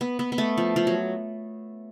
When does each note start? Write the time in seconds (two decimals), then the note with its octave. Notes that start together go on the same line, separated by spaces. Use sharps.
0.01 B3
0.19 B3
0.32 B3
0.38 A3
0.57 F3
0.76 F3
0.87 F#3